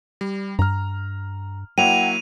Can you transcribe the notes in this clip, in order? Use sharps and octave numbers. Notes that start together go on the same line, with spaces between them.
G3
G2 A#5 F6
F#3 A#3 E4 F#5 G5 D#7 F7